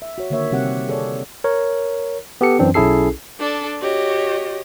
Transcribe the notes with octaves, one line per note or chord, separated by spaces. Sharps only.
E5
F#4 C#5
D3 D#3 A#3 C#5 E5
C3 G3 C4 G4 F#5
G#4 A4 C#5 D5
A#4 C#5
B3 G4 A4 C#7
F#2 E3 C4 D4
B1 C#4 E4 G#4 A4 C7
D4 A4 D5
F#4 G4 C#5 D#5